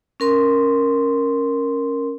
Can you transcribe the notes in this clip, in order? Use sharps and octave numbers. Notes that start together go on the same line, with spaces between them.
C#4 A#4 C6